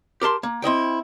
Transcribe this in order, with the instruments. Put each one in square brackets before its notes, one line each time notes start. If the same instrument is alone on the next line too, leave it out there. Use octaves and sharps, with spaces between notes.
[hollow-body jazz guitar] G4 A#4 A5 C6
A#3
C4 E4 D#5 G5